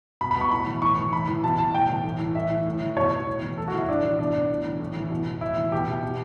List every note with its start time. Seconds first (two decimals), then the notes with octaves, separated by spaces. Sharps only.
0.21 B2 B5
0.31 B5
0.36 B2 C#6
0.51 A2 B5
0.67 E3
0.82 A2 C#6
0.98 E3
1.13 A2 B5
1.28 E3
1.44 B2 A5
1.58 B2 A5
1.74 A2 G5
1.89 E3
2.05 A2
2.19 E3
2.35 A2 E5
2.50 E3
2.66 A2
2.81 E3
2.96 B2 C#5
3.12 B2
3.27 A2
3.42 E3
3.57 A2 A4
3.68 F#4
3.73 E3 E4
3.89 A2 D4
4.03 E3
4.18 B2 D4
4.34 B2
4.50 A2
4.66 E3
4.80 A2
4.96 E3
5.10 B2
5.26 B2
5.41 A2 E4
5.57 E3
5.72 B2 G4
5.87 B2
6.03 B2